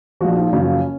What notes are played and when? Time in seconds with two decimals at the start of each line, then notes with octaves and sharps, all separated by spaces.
0.21 A#1 A#2 F3 F#4
0.36 D#4
0.52 F#1 F#2 C#3 F3 C#4